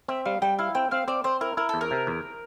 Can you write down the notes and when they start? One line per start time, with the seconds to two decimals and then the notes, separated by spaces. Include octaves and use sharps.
0.08 C4 E5
0.25 G3 F5
0.42 G3 G5
0.59 E4 F5
0.75 C4 G5
0.91 C4 F5
1.08 C4 D5
1.24 C4 C5
1.41 E4 A#4
1.57 E4 A#4
1.69 E2 A4
1.81 A#4
1.91 C3
2.07 E2